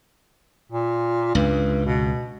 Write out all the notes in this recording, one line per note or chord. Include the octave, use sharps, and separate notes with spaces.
A#2
C#2 G2
B2